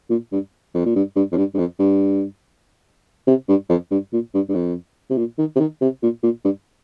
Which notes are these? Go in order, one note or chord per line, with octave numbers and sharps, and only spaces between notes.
A#2
G2
F2
A#2
G2
G2
F2
G2
G2
F2
G2
C3
G2
F2
G2
A#2
G2
G2
F2
C3
A#2
D#3
C3
D#3
C3
A#2
A#2
G2